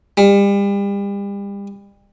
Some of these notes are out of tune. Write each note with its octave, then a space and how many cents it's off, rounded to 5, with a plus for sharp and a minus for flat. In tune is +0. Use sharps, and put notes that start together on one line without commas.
G3 +35